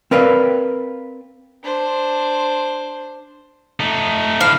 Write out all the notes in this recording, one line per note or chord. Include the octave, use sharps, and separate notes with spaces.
C4 A#4 B4 D5 F5
D4 C5
A3 D#4
D3 E4 F5